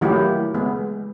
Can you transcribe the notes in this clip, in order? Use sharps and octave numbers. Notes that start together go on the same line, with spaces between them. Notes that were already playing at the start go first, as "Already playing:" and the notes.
D#3 F#3 A3 A#3 E4 G4
G#3 B3